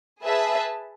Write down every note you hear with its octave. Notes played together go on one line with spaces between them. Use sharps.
G#4 B4 E5 A5